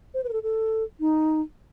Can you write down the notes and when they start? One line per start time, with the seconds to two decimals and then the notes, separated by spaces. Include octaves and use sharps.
0.14 C5
0.24 B4
0.29 A#4
0.33 A4
0.43 A4
1.00 D#4